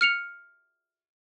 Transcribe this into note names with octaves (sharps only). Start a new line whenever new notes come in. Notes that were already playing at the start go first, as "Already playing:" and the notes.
F6 C#7 F7